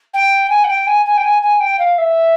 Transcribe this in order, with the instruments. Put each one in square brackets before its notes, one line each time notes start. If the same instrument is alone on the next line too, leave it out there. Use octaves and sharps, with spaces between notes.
[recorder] G5
G#5
F#5
G5
G#5
G#5
G5
G#5
G#5
G5
F5
E5